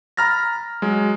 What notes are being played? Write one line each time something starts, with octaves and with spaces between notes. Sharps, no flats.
A#5 B5 F6 A6 A#6
F#3 G#3